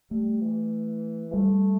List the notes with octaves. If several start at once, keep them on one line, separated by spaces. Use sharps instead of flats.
G3 A3
E3
G3 A3